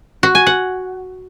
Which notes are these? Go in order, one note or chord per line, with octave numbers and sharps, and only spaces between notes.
F#4
G#5
F#5